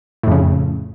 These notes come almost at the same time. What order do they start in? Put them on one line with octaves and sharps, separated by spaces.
A2 F2 C#3